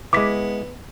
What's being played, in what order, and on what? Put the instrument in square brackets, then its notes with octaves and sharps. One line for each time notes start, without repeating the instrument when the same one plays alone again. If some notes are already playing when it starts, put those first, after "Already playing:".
[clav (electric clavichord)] G#3 E4 [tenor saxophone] B3 [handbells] D6 B6